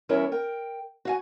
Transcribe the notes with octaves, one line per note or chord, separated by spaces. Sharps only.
E2 G3 C#4 E4 A#4 C#5
A#4 G5
F#4 F5 G#5